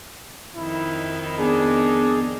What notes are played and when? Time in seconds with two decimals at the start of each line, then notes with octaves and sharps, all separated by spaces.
0.56 F2 D#3 D#4 E4
1.38 B3 D4 G#4